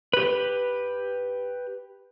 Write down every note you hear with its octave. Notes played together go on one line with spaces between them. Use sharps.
G4 B4